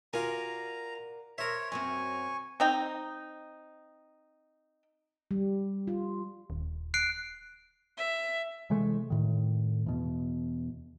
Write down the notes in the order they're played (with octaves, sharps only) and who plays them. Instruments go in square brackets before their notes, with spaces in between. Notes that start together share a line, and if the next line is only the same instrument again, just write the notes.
[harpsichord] F4 G#5 [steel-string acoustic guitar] F#4 A#4 D5 [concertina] A#5
[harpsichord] A#4 E5 [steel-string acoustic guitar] C5 [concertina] C#5
[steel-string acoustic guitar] F#2 F#3 C4 [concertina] G#5 C#6
[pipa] C4 D#4 G5
[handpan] G3
F4
[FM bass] D#1
[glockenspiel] F#6 C7 D7
[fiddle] E5
[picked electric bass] C3 E3 G#3 A3
A2 D#3
E2 B2